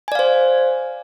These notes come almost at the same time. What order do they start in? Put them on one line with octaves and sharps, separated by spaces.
G#5 D5 F5 C5